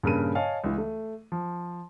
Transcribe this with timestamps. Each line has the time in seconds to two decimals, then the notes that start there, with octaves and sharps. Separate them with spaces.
0.03 G2 A#2 C#3 A#4 B5 D#7
0.35 C#5 D#5 F5 G#5 A5
0.64 C#2 E3
0.78 A3
1.32 F3